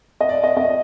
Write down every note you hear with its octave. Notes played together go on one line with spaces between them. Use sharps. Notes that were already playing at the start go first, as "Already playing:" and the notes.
D#5
D5
D#5
D#5